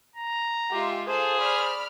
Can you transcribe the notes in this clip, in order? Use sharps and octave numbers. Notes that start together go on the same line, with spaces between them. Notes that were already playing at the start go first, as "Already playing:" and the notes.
A#5
G#3 F4 G4 E5
F4 G#4 A4 C5 F5
D5 B5 F6